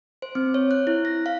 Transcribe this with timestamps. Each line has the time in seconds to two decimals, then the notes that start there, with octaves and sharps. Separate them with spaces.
0.22 C5
0.35 C4
0.54 C#5
0.71 F#6
0.87 E4
1.05 A#6
1.26 F5